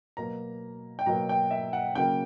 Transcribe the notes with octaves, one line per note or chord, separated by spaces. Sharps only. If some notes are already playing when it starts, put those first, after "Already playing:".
B2 F#3 A#3 A#5
G5
B2 F#3 A#3 A#5
G5
E5
F#5
C#3 F#3 A#3 G5